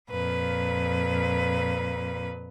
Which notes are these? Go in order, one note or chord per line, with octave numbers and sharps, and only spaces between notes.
F2 A#2 B4